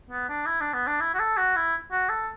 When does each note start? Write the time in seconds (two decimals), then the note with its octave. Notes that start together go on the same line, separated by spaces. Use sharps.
0.10 B3
0.29 D4
0.46 E4
0.61 D4
0.73 B3
0.87 D4
1.01 E4
1.14 F#4
1.19 A4
1.37 F#4
1.56 E4
1.92 F#4
2.09 A4